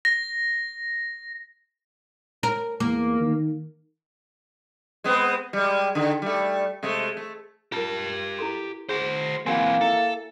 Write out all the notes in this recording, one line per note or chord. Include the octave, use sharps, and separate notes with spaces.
A#6
A#4
E2 A#3
D#3
G#3 B3 C4
G3 G#3
D3 D#3
G3 A3
C3 G#3 A3
A3
F4 G4 A#4 A5
E4 A4 C6
F#4 G#4 C5
E3 A#3 C4 F#4 F#5 G#5
E4 A4 E5